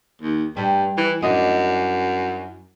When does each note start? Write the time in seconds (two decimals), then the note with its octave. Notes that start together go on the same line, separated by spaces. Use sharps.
0.22 D#2
0.57 G2 G3
0.98 E3
1.22 F#2 D4 E4 D#5